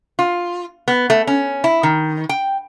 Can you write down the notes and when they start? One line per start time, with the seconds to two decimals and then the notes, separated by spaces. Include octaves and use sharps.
0.19 F4
0.88 B3
1.10 A3
1.27 C#4
1.64 E4
1.83 D#3
2.29 G5